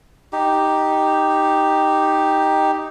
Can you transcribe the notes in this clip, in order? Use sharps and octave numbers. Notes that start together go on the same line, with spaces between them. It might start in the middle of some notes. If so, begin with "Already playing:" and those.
D#4 G4